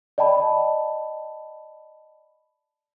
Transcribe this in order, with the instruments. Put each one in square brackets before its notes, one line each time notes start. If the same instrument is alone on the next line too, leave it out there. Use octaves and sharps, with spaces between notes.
[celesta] D5 D#5 G5 A5 B5